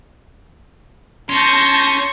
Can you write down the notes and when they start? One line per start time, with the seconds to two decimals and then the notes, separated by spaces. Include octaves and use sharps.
1.30 C#4 A5 C6 C#6 G6 A#6